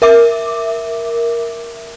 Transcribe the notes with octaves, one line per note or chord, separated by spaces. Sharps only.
A#4 E5 D6